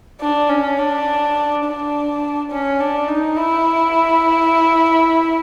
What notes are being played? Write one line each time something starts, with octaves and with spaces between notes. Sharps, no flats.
D4
C#4
D4
D4
C#4
D4
D#4
E4